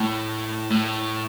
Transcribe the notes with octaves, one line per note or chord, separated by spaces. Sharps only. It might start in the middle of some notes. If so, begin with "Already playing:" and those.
Already playing: A2
A2